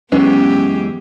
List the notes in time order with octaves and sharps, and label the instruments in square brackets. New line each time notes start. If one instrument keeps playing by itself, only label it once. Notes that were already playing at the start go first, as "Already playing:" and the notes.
[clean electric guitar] F#2 E3 G#3 [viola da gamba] B3 G4 G#4 [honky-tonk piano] C#4